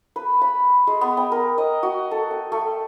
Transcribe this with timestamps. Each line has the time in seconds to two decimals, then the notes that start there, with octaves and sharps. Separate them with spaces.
0.16 B4
0.41 B5
0.87 G#3
1.01 B3
1.17 G5
1.32 A#4
1.58 D#5
1.83 F#4
2.11 A4
2.31 G5
2.52 A3